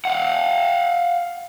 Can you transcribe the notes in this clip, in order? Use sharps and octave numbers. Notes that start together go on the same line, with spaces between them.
F5 F#5